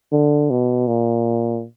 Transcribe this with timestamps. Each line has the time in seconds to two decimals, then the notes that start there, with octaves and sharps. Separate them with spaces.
0.12 D3
0.50 B2
0.87 A#2